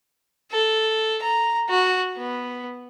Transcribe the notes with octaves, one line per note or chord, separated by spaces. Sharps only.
A4
A#5
F#4
B3